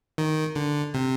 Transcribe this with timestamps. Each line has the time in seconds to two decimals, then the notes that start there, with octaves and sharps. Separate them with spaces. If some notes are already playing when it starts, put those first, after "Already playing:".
0.18 D#3
0.56 D3
0.94 C3